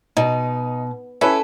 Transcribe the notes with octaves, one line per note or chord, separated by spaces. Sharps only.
B2 D#4
C#4 E4 A4 B4